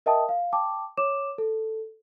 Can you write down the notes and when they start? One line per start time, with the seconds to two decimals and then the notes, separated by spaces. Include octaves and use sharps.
0.06 A#4 D#5 E5 G5 A5 D#6
0.29 F5
0.53 G5 A5 D6
0.97 C#5 D6 E7
1.38 A4